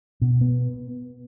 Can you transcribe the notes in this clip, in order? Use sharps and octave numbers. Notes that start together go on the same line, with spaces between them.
B2
B3